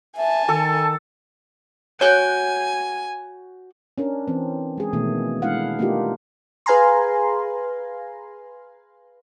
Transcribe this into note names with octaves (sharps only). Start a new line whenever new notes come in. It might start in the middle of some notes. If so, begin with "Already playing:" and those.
E5 G#5 A5
D#3 A4
F#4 C#5 G5 G#5 F#6
C#4 D4 A#4
E3 C4
G#3 G#4
B2 D#3 E3 A3 A#3
G#3 D4 E4 F5 F#5
A3 A#3 D4 D#4 F4 G4
G#4 B4 F5 G#5 A#5 C6